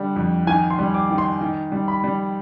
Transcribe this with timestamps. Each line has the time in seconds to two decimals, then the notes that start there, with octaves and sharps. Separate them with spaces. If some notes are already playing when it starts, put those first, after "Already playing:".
Already playing: D3 G3
0.16 F2
0.47 D#3 G#5
0.70 C6
0.79 G3
0.94 D6
1.10 D#3
1.18 C6
1.41 D#3
1.72 G3
1.88 B5
2.04 G3